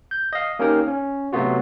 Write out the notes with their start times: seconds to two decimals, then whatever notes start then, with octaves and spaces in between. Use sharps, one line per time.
0.11 G6
0.33 D#5 F5
0.59 A#3 C#4 D#4 G4 A#4
0.88 C#4
1.33 C3 F#3 A3 B3 F4 F#4